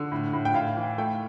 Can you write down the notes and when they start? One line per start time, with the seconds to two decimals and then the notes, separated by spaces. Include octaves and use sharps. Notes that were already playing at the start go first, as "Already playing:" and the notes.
Already playing: D3
0.12 A2
0.33 A2
0.45 G5
0.54 A2 F5
0.77 E3
0.98 A3 G5